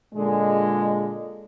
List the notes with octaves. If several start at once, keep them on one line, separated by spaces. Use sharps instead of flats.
A#2 D3 G#3